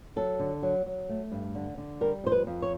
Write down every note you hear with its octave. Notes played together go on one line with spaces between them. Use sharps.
F#3 A4
D3
F#3
F#3
A3
G2
D3
D3
G3 A#4
F2 C5
B4
F2
C#5